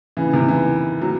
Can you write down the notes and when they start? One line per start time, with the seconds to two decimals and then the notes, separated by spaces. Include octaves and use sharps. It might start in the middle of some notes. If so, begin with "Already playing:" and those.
0.17 C#3 E3
0.28 C#3
0.33 C3 D#3
0.48 C#3 E3
1.02 F#3